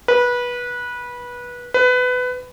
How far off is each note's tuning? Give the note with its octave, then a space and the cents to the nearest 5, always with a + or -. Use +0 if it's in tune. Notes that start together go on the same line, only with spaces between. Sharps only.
B4 -20
B4 +20